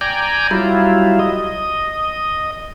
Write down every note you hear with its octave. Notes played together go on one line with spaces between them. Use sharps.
D5 G5 G#5 A#5
F#3 G3 E4 F4
D#5